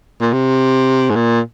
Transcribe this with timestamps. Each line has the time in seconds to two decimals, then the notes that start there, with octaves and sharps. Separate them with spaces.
0.21 A#2
0.32 C3
1.10 G#2
1.15 A#2